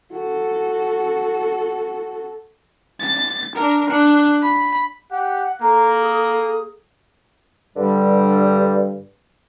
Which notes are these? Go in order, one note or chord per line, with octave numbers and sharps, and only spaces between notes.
F#4 A4
A6
D4 A#4
D4 F#6
B5
G4 F#5 F#6
A#3 A4 A#5
G#4 D#6
G2 D3 G3